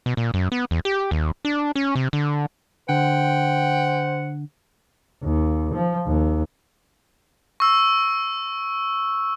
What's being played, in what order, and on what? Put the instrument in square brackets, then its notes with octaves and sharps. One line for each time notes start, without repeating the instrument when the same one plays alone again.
[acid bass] B2
A#2
F#2
B3
E2
G4
D#2
D4
C#4
C3
D3
[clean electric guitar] D3 [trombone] C5 [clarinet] F#5 [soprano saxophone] G5
[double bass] D#2
F3
D#2
[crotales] C#6 E6